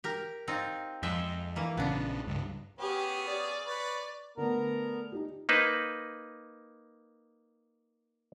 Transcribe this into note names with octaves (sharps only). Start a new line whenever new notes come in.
G4 A#4
C4 D#4 F4
F2 G#3 E5 G5
E3 A#3
A#1 C#3 B3 D4
C#2 G2
B3 C#4 G4 G#4
D5
B4 C#5
D3 A3 B3 A#4 A#5
D#4 G4
A#3 D#4 B4 C5